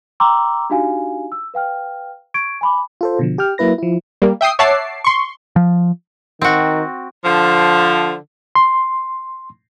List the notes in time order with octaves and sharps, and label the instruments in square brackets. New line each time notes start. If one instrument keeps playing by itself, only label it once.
[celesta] G5 A#5 C6 D6 E6
D4 D#4 F#4 G4 F5 G#5
E6
B4 F5 G5 F6
C#6 G#6 D7
G#5 B5 D6
[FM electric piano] F4 A4 C5
B2 D3 F3
G4 G5 F6
F#3 A#3 E4 B4 A#6
F3 E4
[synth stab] G3 A#3
E5 G5 D#6 C7
C#5 E5 F#5 A5 D6 C7
C6 C#6
[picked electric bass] F3
[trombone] D#3 [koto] C4 F#4
[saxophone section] D3 F3
[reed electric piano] C6